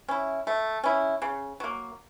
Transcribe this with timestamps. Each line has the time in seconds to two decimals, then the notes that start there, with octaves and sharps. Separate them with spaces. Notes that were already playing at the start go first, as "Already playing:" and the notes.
0.08 C#4 E4
0.47 A3
0.84 C#4 E4
1.22 C#3
1.60 F#3 A#3